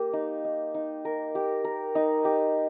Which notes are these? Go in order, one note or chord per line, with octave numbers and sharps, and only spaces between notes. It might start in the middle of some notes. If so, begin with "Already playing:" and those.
Already playing: A#3 G4
D#4
D#4
D#4
A#4
G4
A#4
D#4
G4